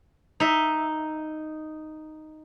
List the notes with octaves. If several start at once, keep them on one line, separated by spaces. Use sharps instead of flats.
D#4 E5